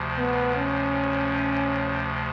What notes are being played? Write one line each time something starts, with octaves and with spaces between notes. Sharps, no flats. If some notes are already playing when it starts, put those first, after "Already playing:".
Already playing: D2 C3 F3
B3
C#4